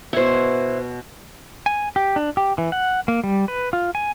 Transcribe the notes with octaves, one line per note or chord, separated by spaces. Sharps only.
B2 E4 C5 C#5
G#5
G4
D4
G4
E3
F#5
A#3
G3
B4
F4
G#5